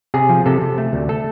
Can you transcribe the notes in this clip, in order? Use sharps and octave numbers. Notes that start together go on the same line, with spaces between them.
C3 G#4
F3
C3 A4
C3
A3
D2
A3 A4